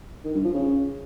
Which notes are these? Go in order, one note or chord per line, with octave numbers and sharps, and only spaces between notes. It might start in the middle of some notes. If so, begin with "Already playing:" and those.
D#3
G2
F3
C#3